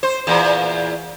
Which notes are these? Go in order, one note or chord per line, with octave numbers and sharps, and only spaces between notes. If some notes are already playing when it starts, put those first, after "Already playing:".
C5
E2 A#2